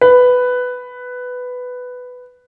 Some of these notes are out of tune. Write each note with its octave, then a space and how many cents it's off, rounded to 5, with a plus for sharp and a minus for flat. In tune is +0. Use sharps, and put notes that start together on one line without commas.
B4 +10